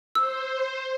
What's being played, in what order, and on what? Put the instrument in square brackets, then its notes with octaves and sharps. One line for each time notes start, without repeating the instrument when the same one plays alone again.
[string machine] C5 [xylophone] E6